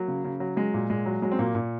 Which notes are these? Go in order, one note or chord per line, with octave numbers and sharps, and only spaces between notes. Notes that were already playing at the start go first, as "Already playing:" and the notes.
Already playing: F#3 A#3
C#3
C#3
F#3
F#3 G#3
A#2
A#2 G#3
F#3
F#3 G#3
C4
A#2 A#3
A#2